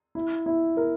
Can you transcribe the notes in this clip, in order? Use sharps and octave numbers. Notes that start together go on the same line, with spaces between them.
E4
E4
A#4